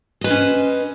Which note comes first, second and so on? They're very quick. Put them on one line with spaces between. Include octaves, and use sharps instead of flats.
D#5 B4 C5 C#4